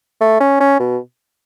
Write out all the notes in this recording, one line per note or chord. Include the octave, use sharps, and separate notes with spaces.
A3
C#4
C#4
B2